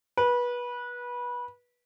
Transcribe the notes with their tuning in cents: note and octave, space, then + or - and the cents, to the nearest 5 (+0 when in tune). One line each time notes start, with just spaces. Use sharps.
B4 -20